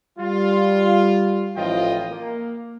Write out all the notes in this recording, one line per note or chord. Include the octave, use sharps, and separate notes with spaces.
G3 F4
A1 A2 F3 F4 D#5 G5
A#3